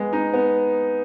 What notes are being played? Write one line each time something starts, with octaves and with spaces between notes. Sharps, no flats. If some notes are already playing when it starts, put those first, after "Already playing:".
Already playing: G#3 B3
D#4
B3